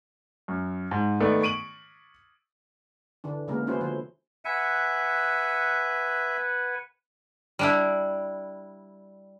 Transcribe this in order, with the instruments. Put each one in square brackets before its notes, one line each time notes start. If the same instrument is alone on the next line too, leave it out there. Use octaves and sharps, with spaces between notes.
[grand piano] F#2
G#2
D#3 A3 B3 D5
C#6 D7 D#7 F#7
[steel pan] D3 E3 D4
C#3 E3 G#3 A#3 B3 A#4
B3 C#4 E4 F#4 C5
D3 E3 F3 C5
[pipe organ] B4 F#5 G#5 [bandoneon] E5
[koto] G3 D4 E4